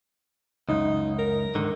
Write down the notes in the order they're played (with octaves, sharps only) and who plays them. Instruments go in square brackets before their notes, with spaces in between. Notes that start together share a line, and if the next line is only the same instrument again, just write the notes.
[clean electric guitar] C#2 F#2 [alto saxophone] D#4
[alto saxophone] A#4
[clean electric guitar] G#2 D3 D#3